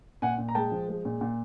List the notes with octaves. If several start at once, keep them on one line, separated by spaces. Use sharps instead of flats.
A#2 F#5 G#5
A#2
A#5
G#3 G5 A5
F3
G#3
A#2
A#2